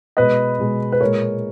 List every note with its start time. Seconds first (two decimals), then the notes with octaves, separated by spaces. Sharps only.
0.17 B2 G#3 B4 D#5
0.59 B2 G#3
0.92 B4
1.01 A#2 G#3 A#4 C#5